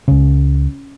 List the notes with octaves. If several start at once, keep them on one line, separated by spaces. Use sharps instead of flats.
C#2 C#3 C#4